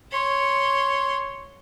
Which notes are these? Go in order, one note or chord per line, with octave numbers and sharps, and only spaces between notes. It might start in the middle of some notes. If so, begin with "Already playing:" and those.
C#5 C6